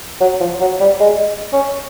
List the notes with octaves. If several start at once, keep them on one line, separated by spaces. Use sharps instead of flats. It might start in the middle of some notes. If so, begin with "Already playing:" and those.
F#3
F3
F#3
G3
G#3
C#4